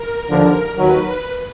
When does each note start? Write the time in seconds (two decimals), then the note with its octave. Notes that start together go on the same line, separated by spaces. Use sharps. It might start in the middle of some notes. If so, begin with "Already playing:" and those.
Already playing: A#4
0.28 D#2 D3 F3
0.77 D#2 D#3 F#3 B4